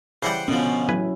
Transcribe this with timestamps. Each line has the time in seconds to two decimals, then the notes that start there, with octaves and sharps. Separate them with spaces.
0.22 C#3 E3 G3 C5 F#5 G5
0.48 B2 D3 F3 C#4
0.89 A1 F#3 E4 B4 G#5